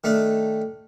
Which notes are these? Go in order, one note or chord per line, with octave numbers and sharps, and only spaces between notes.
D#3 A3 D4